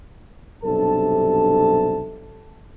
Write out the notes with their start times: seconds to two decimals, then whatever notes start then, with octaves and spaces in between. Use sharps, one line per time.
0.64 B1 G2 C3 D4 A4 A5